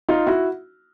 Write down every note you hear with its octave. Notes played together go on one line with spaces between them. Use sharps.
D#4 F4
E4 F#4